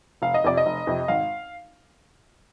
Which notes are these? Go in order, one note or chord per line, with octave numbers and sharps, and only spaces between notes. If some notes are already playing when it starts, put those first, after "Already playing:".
F1 F5
D#5
F2 C3 D5
D#5
F1
F2 C3
G#1 F5